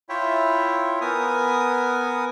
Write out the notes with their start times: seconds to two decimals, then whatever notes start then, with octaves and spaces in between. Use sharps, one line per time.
0.09 E4 F4 C#5 E5 G5
1.01 B3 A#4 G#5 D#6